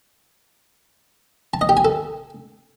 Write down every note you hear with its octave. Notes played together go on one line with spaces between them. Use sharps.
A5
D#5
G4
G#5
A4